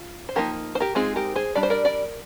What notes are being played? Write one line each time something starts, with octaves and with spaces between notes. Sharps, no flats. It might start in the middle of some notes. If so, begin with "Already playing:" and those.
Already playing: F4
C5
F3 A#3 D#4 G4 A#4
C5
G4 A#4
G#3 C4 D#4 F4 G#4
G4 A#4
G#4 C5
G3 D4 D5
C5
A#4 D5
A#4 D5